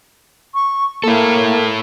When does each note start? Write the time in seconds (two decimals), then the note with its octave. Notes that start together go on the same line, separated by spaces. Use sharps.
0.54 C#6
1.04 A#3 E4 A4